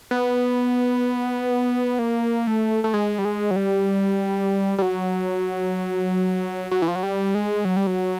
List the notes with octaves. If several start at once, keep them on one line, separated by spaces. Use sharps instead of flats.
B3
A#3
A3
A3
G#3
G3
G#3
F#3
G3
G3
F#3
F#3
E3
F3
F#3
G3
G#3
F#3
G3
F#3